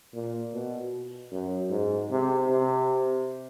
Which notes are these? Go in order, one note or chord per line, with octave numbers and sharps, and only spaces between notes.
A#2
B2
F#2
G#2
C3
C3